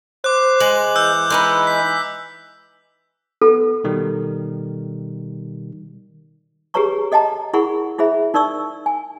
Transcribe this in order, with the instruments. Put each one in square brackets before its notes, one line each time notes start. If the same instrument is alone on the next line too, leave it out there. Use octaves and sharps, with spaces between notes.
[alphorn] C5 [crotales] D6 F#6
[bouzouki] G#3 [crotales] F#7
[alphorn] E3 [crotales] E6 F#6 G6
[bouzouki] G#3 D#4 B4
[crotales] B6
[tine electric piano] B3 [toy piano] A4
[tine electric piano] B2 D#3 G3
[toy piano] G4 G#4 B4 C#5 A#5 C#6
A4 D#5 G5 A5 A#5
E4 G#4 A#4 F#5 B5 C#6
E4 G#4 C5 E5 B5
D#4 A#4 D5 C#6 E6
G#5